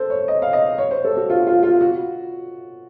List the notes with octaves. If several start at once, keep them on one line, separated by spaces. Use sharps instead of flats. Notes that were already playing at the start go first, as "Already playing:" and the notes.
Already playing: A4 C5
C#5
D#5
F5
D#5
C#5
C5
A4
F#4
F4
F4
F4
F#4